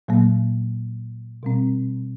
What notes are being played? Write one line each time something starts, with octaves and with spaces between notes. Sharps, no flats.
A#2 F#3 A#3
B2 G3 C4